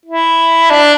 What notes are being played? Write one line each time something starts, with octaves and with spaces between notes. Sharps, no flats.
E4
D4